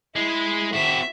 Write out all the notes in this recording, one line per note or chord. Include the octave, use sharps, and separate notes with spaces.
G#3 E4
C4 F#4 E5